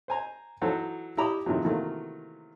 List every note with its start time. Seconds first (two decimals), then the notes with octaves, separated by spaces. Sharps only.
0.08 C5 G#5 A#5
0.61 E3 F#3 D#4 F#4 A4 C5
1.17 E4 G4 A#5 B5 D6 D#6
1.46 A2 C3 D#3 F3 F#3
1.65 C3 D#3 E3 F#3 A3 A#3